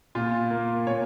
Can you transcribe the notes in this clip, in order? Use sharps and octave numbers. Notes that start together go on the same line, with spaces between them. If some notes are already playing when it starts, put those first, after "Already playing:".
A#2 F4
A#3
A#2 C#5